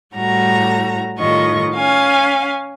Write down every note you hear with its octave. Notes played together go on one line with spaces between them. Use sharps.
A2 G3 F#4 A#5
A2 D#3 G3 F4 D#5 C#6
C#4 F5 G#5